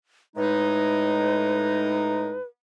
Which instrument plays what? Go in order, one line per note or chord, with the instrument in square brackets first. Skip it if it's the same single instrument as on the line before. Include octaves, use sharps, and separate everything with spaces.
[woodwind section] A2 G#3 D#4 [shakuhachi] B4